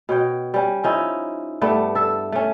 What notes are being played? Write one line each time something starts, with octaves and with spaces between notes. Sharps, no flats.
B2 C#5 G5
G3 C#4
F3 C#4 D#4 E4
G2 A3 B3 D4
A4 E5
A3 C#4